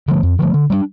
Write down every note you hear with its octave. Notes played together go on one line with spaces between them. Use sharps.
D3 F3 A3
F2
D3 F3 A3
D3
G3 A#3 D4